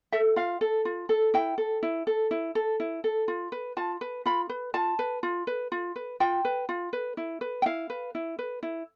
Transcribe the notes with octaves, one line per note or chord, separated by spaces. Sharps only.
A4 E5
F4 F5
A4
F4
A4
E4 G5
A4
E4
A4
E4
A4
E4
A4
F4
B4
F4 A5
B4
F4 B5
B4
F4 A5
B4
F4
B4
F4
B4
F4 G5
B4
F4
B4
E4
B4
G5
E4 F5
B4
E4
B4
E4